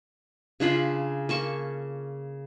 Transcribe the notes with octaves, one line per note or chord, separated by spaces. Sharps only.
C#3 D4 F4 B5
A#3 A5 C#6